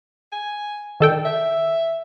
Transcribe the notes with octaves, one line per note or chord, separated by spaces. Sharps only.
G#5
D3 D#3 A4 G5
E5